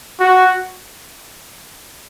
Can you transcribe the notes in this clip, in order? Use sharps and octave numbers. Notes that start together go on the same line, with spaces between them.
F#4